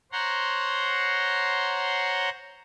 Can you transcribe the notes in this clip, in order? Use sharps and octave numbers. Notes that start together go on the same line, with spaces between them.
C5 C#5 F#5 A#5 C6